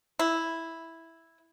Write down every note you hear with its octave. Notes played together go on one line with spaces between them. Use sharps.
E4